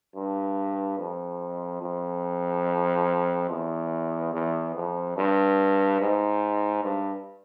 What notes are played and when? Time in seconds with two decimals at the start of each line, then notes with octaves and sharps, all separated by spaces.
0.16 G2
0.98 F2
1.82 F2
3.50 E2
4.33 E2
4.75 F2
5.17 G2
6.01 G#2
6.84 G2